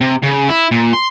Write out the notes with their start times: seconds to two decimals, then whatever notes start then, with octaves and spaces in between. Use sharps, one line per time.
0.01 C3
0.23 C#3
0.49 E4
0.71 A#2
0.93 C6